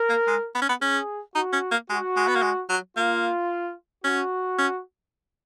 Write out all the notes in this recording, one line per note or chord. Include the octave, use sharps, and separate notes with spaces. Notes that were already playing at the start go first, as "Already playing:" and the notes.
Already playing: A#4
A#3
G#3
B3
C#4
B3
C#4 G#4
D#4 F#4
C#4
A#3
G#3 F#4
G#3
B3
A#3
G#3
F#3
A#3 F4
C#4 F#4
C#4